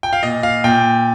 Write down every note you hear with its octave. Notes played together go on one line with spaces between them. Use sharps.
G5
F5
A#2 D#5
F5
A#2 G5